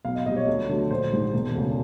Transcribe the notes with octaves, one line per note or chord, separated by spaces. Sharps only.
B1 F5
D#5
A#2 G3 D#5
C#5
D2
D3 F#3 A3
A#1 C5
G#2 D#3 G3
E1
D2 C#3